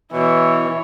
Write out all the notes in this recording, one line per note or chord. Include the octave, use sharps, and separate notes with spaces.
B2 E3 E4 C#5